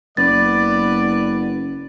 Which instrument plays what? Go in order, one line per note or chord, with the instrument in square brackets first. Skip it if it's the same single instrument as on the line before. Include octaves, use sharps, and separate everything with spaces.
[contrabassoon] F#1 [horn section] B3 B4 D5 [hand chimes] A6